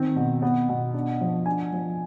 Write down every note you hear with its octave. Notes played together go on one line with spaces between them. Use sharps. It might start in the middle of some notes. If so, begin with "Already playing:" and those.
Already playing: D#3 C4
B2
B3
B2
D4
F3
D4 G#5
F3